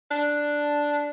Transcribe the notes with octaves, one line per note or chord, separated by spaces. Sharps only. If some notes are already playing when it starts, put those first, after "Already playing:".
D4